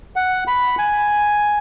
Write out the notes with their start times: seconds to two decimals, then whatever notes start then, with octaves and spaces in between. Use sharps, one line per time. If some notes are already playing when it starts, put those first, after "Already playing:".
0.16 F#5
0.47 B5
0.78 G#5